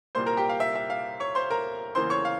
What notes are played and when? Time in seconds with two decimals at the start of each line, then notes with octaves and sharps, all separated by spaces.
0.15 C2 A#2 G3 A#3 C5 C6
0.26 A#4 A#5
0.37 G4 G5
0.49 F5
0.60 E5
0.75 E5
0.90 F5
1.20 C#5 C#6
1.35 C5 C6
1.50 A#4 A#5
1.95 E2 C#3 E3 A#3 C5 C6
2.10 C#5 C#6
2.25 F5